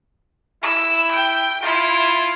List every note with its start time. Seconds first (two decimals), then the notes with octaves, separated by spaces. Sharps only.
0.63 E4 E6
1.12 G5
1.63 E4 F4